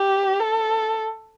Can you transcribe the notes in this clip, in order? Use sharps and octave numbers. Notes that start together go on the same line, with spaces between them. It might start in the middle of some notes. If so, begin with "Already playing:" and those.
Already playing: G4
A4